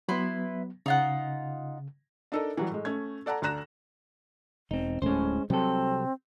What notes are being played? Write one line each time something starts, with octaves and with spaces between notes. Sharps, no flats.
F#3 B3 E4 B4 C6
C#3 D#4 F4 F#5
D4 D#4 A4 A#4 D#5
E3 F#3 G3
A2 G#3
A3 C#4 G#6
A4 D5 F#5 A5 A#5
D2 D4 A#5 F#6 A#6 E7
E1 C4 D#4
D1 A2 G#3 C#4 C5
C2 C3 F#3 C4 A4